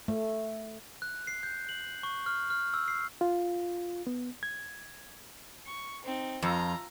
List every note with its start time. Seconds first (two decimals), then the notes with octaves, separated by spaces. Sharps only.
0.08 A3
1.02 F#6
1.27 C7
1.43 G6
1.69 F#7
2.03 C#6
2.26 F6
2.50 F6
2.74 E6
2.88 C7
3.21 F4
4.07 B3
4.43 G#6
5.66 C#6
6.04 C4 D#4
6.42 F2 F4 A#5